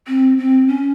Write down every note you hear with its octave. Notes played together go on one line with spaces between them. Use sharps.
C4
C4
C#4